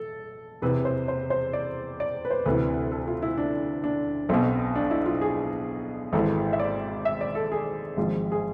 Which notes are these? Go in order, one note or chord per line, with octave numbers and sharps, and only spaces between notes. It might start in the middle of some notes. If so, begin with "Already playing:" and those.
Already playing: A4
E2 C3 E3 B4
C5
C5
C5
D5
D5
B4
C5
D2 C3 E3 B4
A4
F4
E4
D4
D4
B1 B2 C4
D4
E4
F4
G#4
G#1 G#2 E3 A4
E5
D5
E5
D5
A4
G#4
G#1 G#2 F3
G#4